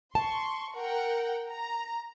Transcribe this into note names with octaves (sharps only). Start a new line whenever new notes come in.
A5 C6 C#6
A#4 F#5 G5
A#5